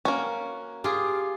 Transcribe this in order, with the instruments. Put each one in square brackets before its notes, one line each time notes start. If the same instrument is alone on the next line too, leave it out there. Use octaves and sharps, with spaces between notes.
[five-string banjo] A#3 C#4 [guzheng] F#4
[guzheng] F4 G#4 [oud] G4 [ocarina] D6